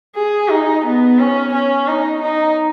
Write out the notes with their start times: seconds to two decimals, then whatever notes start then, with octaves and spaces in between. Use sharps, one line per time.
0.16 G#4
0.50 D#4
0.85 B3
1.19 C#4
1.53 C#4
1.88 D#4
2.22 D#4